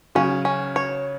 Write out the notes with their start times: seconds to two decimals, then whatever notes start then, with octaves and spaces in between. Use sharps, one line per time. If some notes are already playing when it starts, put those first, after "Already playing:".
0.15 C#3 F#3 C#4
0.45 C#4
0.76 C#5